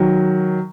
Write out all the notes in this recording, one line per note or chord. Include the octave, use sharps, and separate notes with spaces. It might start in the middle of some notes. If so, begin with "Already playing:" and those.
Already playing: D#3 F#3